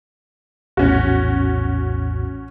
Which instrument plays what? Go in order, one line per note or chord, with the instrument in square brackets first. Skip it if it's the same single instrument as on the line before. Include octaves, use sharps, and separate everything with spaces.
[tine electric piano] A#1 E2 A2 [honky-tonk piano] C#4 F#4